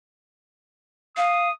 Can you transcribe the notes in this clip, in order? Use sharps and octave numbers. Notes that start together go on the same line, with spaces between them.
F5 D#6